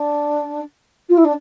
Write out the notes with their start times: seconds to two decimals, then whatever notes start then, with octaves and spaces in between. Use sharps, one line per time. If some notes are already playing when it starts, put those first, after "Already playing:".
Already playing: D4
1.09 F4
1.17 E4
1.24 D4